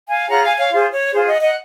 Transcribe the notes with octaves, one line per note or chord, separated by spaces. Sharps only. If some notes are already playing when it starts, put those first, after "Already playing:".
F5 G#5
F4 G#4 C#5 F#5 A#5
F5 G#5
C#5 F5
F4 G#4 C5
C#5
F4 G#4 C5
D#5 F#5
D#5 F#5